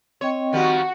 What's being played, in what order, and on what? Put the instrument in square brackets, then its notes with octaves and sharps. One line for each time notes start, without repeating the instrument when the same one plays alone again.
[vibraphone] C4 D#5 G5 [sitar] C#5
[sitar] D#3 F3 G3 [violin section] F#4